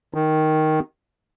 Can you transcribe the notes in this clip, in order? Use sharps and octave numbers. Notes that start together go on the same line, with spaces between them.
D#3